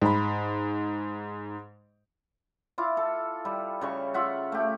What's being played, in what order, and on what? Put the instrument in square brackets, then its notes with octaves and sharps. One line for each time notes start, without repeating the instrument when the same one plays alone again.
[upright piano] G#2 B5
[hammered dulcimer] E4 F4 D6
A4
G3
C#3 G3 C#6
F4 E5 F#5
A3 G4